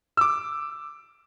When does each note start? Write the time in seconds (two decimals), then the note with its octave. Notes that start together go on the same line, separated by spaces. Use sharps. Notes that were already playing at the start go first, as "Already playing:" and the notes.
0.17 D6 E6